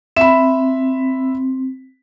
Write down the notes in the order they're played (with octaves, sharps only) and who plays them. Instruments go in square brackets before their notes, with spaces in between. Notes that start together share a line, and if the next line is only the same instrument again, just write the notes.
[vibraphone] C4 [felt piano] E5 B5